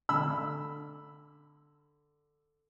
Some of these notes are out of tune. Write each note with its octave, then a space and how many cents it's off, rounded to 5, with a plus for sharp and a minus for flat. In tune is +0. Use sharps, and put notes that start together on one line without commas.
D3 +5 B5 +5 E6 +0